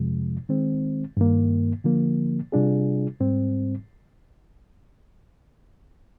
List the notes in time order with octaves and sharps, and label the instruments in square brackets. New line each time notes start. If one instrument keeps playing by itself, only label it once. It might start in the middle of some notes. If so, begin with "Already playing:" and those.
Already playing: [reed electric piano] F2 C3 F3 G#3
D#3 G#3 C4
G2 D#3 A#3
D3 F3 A#3
C3 G3 D4 F4 G#4
G#2 G3 C4